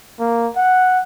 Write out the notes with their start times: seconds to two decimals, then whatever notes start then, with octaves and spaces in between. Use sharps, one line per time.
0.20 A#3
0.56 F#5